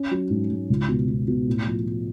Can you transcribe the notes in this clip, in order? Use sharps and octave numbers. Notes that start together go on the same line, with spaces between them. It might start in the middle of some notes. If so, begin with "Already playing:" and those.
Already playing: C#4
F#3
G#2
G#2
C#2
B2
B2
B2
A2
F3
F3